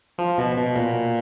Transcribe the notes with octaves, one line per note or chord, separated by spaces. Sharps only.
F3
B2
B2
A#2